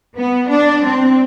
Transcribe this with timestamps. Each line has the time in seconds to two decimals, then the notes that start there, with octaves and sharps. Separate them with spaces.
0.18 B3
0.49 D4
0.85 C4